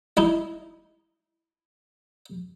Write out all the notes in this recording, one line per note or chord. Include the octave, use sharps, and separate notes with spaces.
D#4 E4